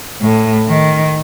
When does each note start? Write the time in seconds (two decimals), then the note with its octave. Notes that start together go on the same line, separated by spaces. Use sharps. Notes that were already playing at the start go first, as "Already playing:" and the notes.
0.21 A2
0.69 D#3